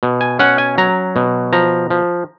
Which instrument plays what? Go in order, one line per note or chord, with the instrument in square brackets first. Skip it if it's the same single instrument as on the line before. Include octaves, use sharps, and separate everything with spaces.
[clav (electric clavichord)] B2
G#5
C#4 F#5
G#5
F#3 A#5
B2
F3 A#5
F3